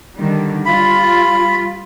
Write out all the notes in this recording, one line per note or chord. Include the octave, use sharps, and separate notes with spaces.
D3 D#3 G3
G3 F4 B5